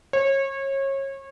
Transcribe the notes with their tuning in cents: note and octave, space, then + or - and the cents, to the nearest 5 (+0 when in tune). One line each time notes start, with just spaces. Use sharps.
C#5 -30